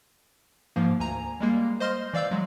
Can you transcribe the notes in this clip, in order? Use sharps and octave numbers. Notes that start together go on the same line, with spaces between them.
G#2 F3 A#3
D2 G#5 A#5
G3 G#3 A#3
C5 D#5 C6 F6
E3 D5 F5 E6 G6
F#3 G#3